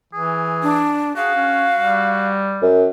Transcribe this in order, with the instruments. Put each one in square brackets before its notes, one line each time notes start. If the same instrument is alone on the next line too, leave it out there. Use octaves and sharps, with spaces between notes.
[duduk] E3 [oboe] G#4
[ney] D4
[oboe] F#4 [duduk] G#4 [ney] F5
[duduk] C#4
G3
[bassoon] F#2